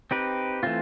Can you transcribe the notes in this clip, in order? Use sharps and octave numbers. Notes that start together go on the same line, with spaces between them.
C4 D#4 G4 B4
E3 A3 C4 F4